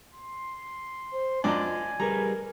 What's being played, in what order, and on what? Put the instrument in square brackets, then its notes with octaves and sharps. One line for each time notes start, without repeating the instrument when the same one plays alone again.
[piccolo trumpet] C6
[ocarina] C5
[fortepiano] F#2 D4 [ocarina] F4 [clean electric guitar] D5 D#5 [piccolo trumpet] G#5
[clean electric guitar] G3 G#4 B4 [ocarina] A#4 [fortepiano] A#5